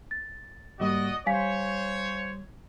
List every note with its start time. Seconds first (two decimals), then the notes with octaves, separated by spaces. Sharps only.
0.11 A6
0.80 G#2 G3 A#3 F#4 D5 D#5
1.26 G3 C5 C#5 F5 G#5 B6